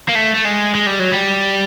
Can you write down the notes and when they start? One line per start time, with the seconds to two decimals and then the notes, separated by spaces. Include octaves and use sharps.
0.09 A#3
0.15 A3
0.35 A3
0.45 G#3
0.75 G#3
0.87 G3
1.00 F#3
1.13 G3